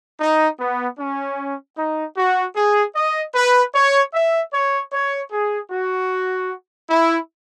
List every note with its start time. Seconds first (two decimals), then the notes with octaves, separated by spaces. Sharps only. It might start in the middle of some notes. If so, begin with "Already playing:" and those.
0.20 D#4
0.59 B3
0.99 C#4
1.77 D#4
2.17 F#4
2.56 G#4
2.95 D#5
3.35 B4
3.75 C#5
4.14 E5
4.53 C#5
4.93 C#5
5.32 G#4
5.71 F#4
6.90 E4